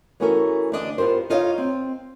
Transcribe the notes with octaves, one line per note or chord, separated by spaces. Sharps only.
E3 A3 B3 C#4 F#4 A#4
D2 D4 D#5
B3 F4 G4 A#4 C5
D#4 F4 C#5 D#5 F5
C4